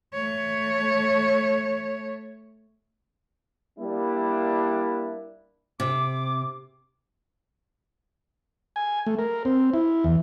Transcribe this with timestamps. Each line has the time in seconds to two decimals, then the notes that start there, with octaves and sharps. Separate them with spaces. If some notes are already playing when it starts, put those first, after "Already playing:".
0.13 A3 C#5
3.78 G3 A#3 D4 E4
5.80 C3 D6
8.76 G#5
9.07 A3
9.19 A#4
9.45 C4
9.74 E4
10.04 E2